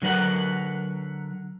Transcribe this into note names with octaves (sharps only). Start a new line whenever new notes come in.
D3 F#3 A#4 B4 F#5